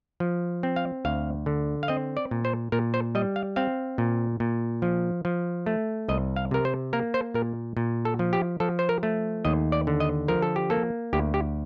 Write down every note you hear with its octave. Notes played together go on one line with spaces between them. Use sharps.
F3
C4
F5
D2 F5
D3
F5
C4 D#5
D5
A#2
C5
A#2 A#4
C5
G3 D#5
F5
C4 F5
A#2
A#2
F3
F3
A3
C2 D#5
F5
C3 A#4
C5
A#3 A#4
C5
A#2 A#4
A#2
A4
F3
G4
F3 A4
C5
A#4
A3
D#2 D#5
D5
D3
D#5
F3 A#4
A4
G4
A#3 A4
D2 G4
G4